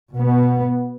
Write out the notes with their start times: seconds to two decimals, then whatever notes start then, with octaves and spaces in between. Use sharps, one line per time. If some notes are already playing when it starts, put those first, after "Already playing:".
0.14 B2 B3